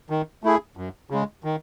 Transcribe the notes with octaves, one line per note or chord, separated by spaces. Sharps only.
D#3
A3 E4 G#4
F#2
C#3 G#3
D#3